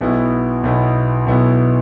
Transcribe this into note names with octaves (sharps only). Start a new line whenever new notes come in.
B1 B2 B3 E4
B1 B2 B3 E4
B1 B2 B3 E4